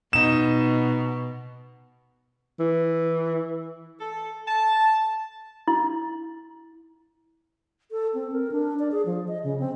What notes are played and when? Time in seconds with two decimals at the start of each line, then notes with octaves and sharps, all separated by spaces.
0.13 B2 D#4 E7
2.60 E3
4.00 A4
4.48 A5
5.68 E4
7.91 A4
8.14 C4
8.32 A#4
8.52 D4
8.79 D5
8.92 G#4
9.06 F3
9.28 D#5
9.44 C#3
9.60 C4